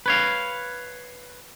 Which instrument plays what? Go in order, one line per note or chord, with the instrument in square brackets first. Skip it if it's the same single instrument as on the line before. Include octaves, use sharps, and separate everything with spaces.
[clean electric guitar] B4 C#5 F5